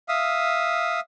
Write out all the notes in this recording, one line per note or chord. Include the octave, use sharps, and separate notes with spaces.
E5 F5 D#6